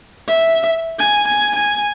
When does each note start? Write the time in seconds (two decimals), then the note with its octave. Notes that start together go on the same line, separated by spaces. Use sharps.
0.28 E5
0.99 G#5
1.27 G#5
1.56 G#5